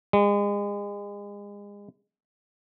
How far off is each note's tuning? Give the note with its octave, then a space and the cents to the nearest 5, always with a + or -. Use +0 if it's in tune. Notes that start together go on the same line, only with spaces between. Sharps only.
G#3 -35